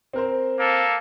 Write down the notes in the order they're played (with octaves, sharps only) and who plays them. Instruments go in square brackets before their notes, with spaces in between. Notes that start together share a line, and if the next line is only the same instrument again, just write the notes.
[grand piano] C4 A#4 C5
[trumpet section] A#3 A4